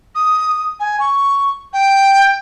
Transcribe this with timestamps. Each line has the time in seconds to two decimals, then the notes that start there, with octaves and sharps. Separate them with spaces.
0.14 D#6
0.79 G#5
0.99 C#6
1.72 G5